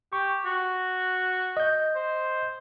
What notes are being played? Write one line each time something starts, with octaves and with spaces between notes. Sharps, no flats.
G4 C#6
F#4
D#5 G6
C5